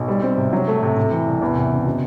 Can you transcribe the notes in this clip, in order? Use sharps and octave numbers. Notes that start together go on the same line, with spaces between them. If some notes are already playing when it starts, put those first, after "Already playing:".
Already playing: B1
G3
C4
C3
F#3
A3
C3
C3
E3
C2
E2
C3
F#1
B2